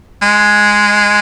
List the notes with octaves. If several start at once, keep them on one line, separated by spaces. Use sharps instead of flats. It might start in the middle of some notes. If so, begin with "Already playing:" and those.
G#3